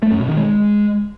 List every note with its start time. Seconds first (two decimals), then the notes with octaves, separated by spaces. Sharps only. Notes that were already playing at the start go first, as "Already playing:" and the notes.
0.02 A3
0.11 F#2
0.20 B2
0.29 D#3
0.37 G#3